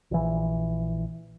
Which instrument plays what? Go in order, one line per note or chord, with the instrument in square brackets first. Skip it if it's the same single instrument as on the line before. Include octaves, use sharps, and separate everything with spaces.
[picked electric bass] A#1 E3